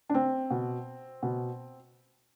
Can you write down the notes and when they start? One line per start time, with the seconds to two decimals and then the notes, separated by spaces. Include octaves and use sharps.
0.09 D4
0.14 C4
0.50 B2
1.23 B2